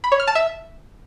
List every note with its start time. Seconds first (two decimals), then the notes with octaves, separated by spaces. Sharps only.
0.04 B5
0.12 C#5
0.20 F6
0.27 A5
0.35 E5